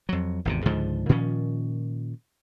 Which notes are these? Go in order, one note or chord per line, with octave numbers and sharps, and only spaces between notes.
F2 F#3
G#1 E2 C3
C#2 G#2 D3 F3
A#2 D#3 F3 C#4